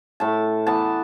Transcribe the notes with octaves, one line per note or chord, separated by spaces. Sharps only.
A2 A5
E3 B3 A5